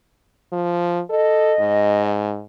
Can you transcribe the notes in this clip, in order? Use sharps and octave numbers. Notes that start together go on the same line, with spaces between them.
F3
A4 D#5
G#2